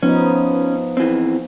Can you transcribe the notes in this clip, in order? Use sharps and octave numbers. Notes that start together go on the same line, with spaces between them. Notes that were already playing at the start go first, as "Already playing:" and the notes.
F3 B3 C#4 D#4
E3 C4